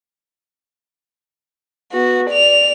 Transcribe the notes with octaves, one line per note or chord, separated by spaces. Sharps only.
B3 F#4
D5 F7